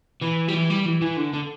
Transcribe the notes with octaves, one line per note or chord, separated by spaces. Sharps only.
E3
G3
E3
G3
E3
E3
D3
D3